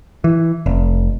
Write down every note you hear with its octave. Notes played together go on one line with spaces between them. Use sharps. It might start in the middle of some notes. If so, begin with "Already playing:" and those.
E3
F1